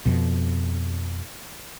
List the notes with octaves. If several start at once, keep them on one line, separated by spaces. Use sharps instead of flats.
F2 B2